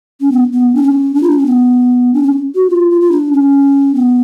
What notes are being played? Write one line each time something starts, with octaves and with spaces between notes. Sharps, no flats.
C#4
B3
B3
D4
C#4
D4
F4
D4
C#4
B3
D4
C#4
F#4
F4
F4
F4
D4
C#4
B3